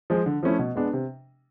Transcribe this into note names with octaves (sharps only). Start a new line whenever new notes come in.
F3 G#3
D3
F3 A3 C#4 E4
B2
G#3 B3 D4
C3